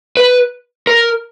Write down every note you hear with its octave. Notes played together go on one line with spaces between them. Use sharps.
B4
A#4